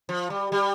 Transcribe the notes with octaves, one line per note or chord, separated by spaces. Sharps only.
F3
G3
G3